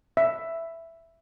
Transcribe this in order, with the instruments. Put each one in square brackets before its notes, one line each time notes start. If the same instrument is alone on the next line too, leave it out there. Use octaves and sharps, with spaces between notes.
[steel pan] E5